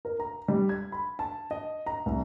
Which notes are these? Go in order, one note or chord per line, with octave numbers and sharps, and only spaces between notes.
A#4
A#5
G3
G#6
B5
A5
D#5
A#5
C2